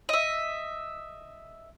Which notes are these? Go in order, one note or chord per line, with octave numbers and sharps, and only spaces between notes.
D#5 E5